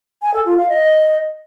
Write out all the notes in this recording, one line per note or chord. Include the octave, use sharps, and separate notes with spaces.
G#5
A4
F4
F5
D#5